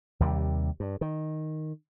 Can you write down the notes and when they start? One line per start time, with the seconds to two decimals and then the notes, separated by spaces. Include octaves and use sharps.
0.20 D#2 C3 G3
0.80 G2
1.01 D#3